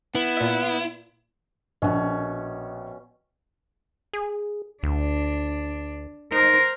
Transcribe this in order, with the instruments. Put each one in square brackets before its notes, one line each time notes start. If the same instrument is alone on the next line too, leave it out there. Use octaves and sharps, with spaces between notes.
[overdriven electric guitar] B3 [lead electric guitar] E4
[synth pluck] A#2 E5
[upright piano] A#1 [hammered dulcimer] B2 C#4
[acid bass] G#4
[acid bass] D2 [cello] D4
[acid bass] D#4 [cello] A#4 C5